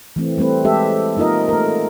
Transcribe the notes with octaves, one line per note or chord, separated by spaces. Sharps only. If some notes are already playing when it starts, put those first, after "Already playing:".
E3 A3 C4
G3 A3 C4 B4
G#3 G4 A4 E5
A#3 D#4 F4 A#4 D#5
A3 A#4